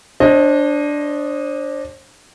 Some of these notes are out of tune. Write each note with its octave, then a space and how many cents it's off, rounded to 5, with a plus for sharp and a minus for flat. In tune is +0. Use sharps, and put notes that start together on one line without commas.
D4 +0 C5 +35 D#5 +0